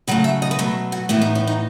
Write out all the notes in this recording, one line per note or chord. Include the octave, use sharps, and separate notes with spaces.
C#3 F#3 A3 F#5
E5
D#5
B4
B2 F#3 A3 C#5
F#4
A2 E3 B3 E4
D#4
C#4
D#4